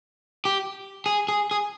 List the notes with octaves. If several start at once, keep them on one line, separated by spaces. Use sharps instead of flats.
G4
G#4
G#4
G#4